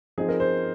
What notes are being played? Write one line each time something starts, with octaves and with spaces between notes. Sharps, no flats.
F3 C4 D#4 G#4
A#4
C5